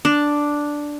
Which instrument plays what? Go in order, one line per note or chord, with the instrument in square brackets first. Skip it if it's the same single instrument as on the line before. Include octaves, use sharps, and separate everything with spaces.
[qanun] D4